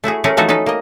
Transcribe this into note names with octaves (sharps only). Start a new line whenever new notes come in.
A3 E4 F#4 G#4
A3 C#4 G#4 A#4
E3 F3 A3 D#4 F#4 A4
C#4 D#4 A4 B4
A#3 D#5